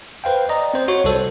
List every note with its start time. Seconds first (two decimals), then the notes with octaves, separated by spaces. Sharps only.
0.24 B4 C5 F5 G5
0.49 D5 D#5 A#5
0.74 C4 C5
0.88 F#4 C#5 C#6
1.04 C2 A4 C5